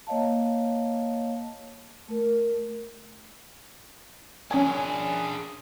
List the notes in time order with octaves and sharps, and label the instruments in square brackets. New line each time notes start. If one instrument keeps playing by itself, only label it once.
[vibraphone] A#3 C#5 D#5 F5 A5
A3 A#4
[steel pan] C#4 G#5 [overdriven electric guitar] D4 G#4